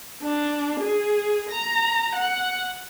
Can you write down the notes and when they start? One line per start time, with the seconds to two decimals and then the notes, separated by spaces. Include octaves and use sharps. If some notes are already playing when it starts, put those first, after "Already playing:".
0.23 D4
0.80 G#4
1.49 A#5
2.15 F#5